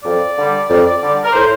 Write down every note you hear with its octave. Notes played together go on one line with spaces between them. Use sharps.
F2 D5
D3 G3
F2
D3 G3
A#4
A2 C5